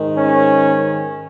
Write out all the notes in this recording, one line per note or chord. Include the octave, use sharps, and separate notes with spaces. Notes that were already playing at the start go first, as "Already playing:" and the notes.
Already playing: G#2 D#3
C#4